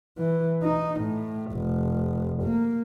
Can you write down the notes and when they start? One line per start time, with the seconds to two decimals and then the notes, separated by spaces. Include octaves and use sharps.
0.18 E3
0.63 D#4
1.01 A2
1.52 F1
2.43 A#3